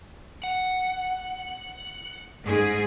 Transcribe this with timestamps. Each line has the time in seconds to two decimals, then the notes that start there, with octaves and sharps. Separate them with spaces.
0.44 F#5
2.44 G#2 G#4